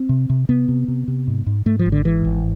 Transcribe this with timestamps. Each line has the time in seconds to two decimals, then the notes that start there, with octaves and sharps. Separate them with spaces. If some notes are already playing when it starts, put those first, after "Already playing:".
Already playing: C4
0.09 C3
0.30 C3
0.49 C3 B3
0.68 C3
0.88 C3
1.08 C3
1.27 G#2
1.46 G#2
1.66 G#2 A3
1.79 F3
1.86 G#1
1.92 D3
2.05 G#2 E3
2.25 G#1